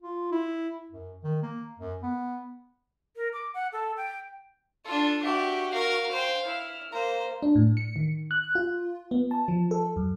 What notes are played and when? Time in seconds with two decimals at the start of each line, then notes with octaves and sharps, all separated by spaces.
0.02 F4
0.32 E4
0.91 F#2
1.24 D#3
1.42 A#3
1.79 F#2
2.03 B3
3.16 A#4
3.33 D6
3.54 F#5
3.73 A4
3.97 G5
4.85 D4 F4 A4
5.24 F#4 G4 E5
5.73 A#4 F5 F6
6.11 C5 G5
6.45 E4 F6
6.93 A#3 C5 A#5
7.42 D4
7.55 A2
7.77 C#7
7.96 D#3
8.31 F#6
8.55 F4
9.11 B3
9.31 A5
9.48 F3
9.71 A4
9.96 F#2